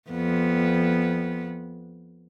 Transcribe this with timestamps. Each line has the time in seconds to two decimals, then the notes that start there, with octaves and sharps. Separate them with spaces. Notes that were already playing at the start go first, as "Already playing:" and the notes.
0.11 F2 B3